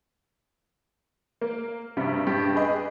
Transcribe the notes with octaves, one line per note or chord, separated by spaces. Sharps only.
A#3
G2 C3 G3
G2 G4
G4 G#4 B4 D#5